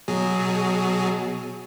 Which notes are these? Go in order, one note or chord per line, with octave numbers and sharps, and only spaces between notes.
B2 F#3 G#4